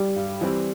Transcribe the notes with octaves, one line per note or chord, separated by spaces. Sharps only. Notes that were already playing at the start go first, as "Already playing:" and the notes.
Already playing: G3
G2
E3 G3 C4